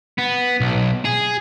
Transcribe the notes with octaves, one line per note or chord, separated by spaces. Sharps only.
B3
B1
G#4